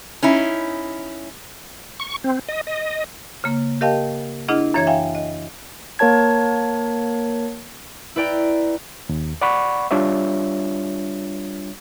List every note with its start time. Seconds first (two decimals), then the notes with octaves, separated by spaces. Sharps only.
0.23 C#4 D#4 E4
2.00 C#6
2.24 C4
2.49 D#5
2.67 D#5
3.44 C#3 A#3
3.81 G4 A#4 D#5 F5 G5 A5
4.48 D4 E4 G#4 D#5 F#5 F6
4.74 F#2 E3 C#5 E5 G#6
4.87 C#5 E5 F5 G5 G#5
5.15 D#5
5.99 A#3 A#4 C#5 A5 G#6
8.16 E4 B4 D5 G5 A#5
9.09 D#2
9.42 D5 F#5 B5 C#6
9.91 G3 D4 F4 C#5 E5